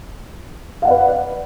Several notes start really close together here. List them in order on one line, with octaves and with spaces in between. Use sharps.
F5 F#5 D5 B4